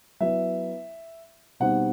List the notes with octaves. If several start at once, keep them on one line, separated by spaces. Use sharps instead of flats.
F#3 B3 E4 E5
B2 G3 C4 D#4 F#5